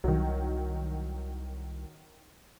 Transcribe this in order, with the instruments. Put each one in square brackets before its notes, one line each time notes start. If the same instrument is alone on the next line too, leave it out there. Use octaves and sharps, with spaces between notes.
[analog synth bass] C2 [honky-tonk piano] D#3 F#3